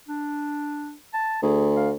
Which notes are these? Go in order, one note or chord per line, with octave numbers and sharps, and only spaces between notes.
D4
A5
D2 G#4
F5